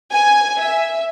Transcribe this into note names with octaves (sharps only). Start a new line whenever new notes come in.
G#5
E5